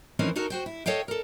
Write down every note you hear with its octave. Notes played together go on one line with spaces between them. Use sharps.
F#2 E3 F3 C4 C#4 D#4
D#4 F#4 A4 A#4 C#5
F#4 C5 G5
E4
A4 C#5 D#5 F5 G5
A4 A#4